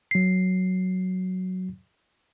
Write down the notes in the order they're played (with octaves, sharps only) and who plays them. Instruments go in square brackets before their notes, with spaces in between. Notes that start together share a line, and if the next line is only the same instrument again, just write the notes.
[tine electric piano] F#3 C7